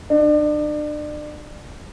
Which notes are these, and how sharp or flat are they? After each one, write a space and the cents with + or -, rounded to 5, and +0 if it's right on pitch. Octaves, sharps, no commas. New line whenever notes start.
D4 +35